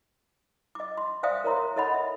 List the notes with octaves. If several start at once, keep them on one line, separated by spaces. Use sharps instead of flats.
D#5 D6
C6
C5 D5 E5 F5 G5 D#6
A#4 C#5 A#5 C6
A4 C#5 D#5 F#5 B5
E5